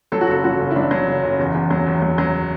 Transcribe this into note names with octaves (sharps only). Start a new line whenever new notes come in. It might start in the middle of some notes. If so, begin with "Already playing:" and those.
F#3 A4
F#4
F#1 A4
F#3 F#4
F#1
E4
F#3 D4
F#3
F#1
F#1
E2
E2
F#3
E2
F#3
F#3